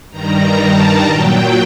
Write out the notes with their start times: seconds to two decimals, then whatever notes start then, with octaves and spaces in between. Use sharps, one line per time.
0.10 G2 D#3 G3 A#5
0.58 A5
1.05 A#2 F#3 G5